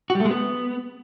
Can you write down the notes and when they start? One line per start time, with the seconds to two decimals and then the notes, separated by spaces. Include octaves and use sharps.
0.10 F#4
0.15 G3
0.20 A3
0.25 G#3
0.31 B3